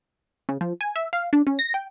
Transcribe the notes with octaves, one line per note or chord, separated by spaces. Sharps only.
C#3
F3
G#5
E5
F5
D4
C#4
A#6
G5